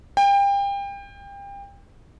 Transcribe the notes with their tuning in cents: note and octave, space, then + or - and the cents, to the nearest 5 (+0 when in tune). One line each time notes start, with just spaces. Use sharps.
G5 +30